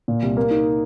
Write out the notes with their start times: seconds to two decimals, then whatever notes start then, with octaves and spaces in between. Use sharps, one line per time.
0.08 A#2
0.22 C2
0.37 A#3
0.51 D#4